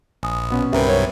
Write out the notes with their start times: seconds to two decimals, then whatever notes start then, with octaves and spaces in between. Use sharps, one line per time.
0.23 A#1 G#5 D#6
0.50 B2 B3 C#4
0.73 C2 G2 C3 G4 A#4 B4 E5 B5
0.87 F#3 C#5